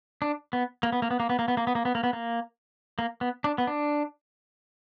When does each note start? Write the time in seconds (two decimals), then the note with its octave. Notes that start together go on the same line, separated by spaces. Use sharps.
0.22 D4
0.53 B3
0.83 A#3
0.93 B3
1.02 A#3
1.11 B3
1.20 A#3
1.30 B3
1.39 A#3
1.48 B3
1.57 A#3
1.67 B3
1.75 A#3
1.85 B3
1.95 A#3
2.04 B3
2.13 A#3
2.99 A#3
3.21 B3
3.44 D4
3.58 B3
3.67 D4